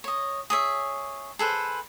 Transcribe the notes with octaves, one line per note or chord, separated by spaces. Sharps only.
C#5 D#5
G#4 C#5 E5
G#4 A4 B4 C5